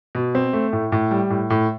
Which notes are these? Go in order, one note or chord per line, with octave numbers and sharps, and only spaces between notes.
B2
C4
A3
A2
A2
G3
A2
A2